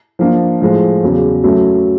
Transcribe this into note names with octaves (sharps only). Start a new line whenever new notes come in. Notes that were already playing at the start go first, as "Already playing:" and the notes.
F3 A#3 D4
A2 F3 G#3
E2 C#3 F#3
F#3 A3 C#4